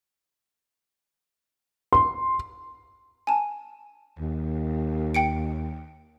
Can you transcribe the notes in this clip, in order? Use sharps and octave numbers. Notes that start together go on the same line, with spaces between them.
C6
G#5 A5
D#2
G5 C#7 D7